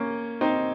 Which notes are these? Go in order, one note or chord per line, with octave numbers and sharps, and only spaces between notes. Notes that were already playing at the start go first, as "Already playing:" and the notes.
Already playing: A#3 C#4
C4 D#4